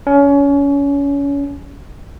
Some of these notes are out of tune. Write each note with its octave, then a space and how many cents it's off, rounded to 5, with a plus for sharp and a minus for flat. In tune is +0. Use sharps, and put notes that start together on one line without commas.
C#4 +25